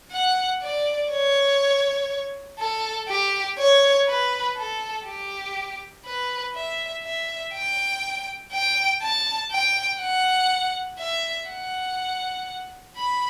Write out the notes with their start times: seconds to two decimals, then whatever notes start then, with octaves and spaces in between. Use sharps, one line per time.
0.12 F#5
0.62 D5
1.12 C#5
2.59 A4
3.09 G4
3.59 C#5
4.08 B4
4.57 A4
5.06 G4
6.06 B4
6.55 E5
7.04 E5
7.54 G5
8.52 G5
9.02 A5
9.51 G5
10.01 F#5
10.99 E5
11.49 F#5
12.97 B5